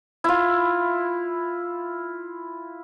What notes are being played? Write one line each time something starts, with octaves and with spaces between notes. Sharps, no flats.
E4 F4